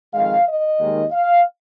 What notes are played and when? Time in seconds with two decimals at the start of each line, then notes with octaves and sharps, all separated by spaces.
0.14 F2 D#3 G#3 F5
0.47 D#5
0.79 D#2 D#3 G#3
1.12 F5